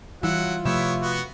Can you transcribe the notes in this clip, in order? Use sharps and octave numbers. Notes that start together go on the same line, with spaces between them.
E3 F#3 G3 E4 F4 F#5
C3 F3 A3 B3 E4 G4 C#5 E5
B3 F#4